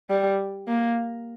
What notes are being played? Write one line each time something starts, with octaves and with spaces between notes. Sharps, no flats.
G3
A#3